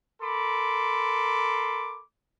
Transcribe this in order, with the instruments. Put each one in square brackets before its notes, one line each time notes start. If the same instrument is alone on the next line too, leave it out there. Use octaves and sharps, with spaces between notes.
[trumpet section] A4 A#4 B5 C6 D6